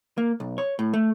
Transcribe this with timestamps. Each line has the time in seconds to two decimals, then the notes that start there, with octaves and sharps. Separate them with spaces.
0.18 A#3
0.40 B1
0.58 C#5
0.79 A2
0.93 A3